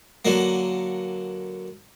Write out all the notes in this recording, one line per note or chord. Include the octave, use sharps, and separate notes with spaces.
D3 F#3 A#3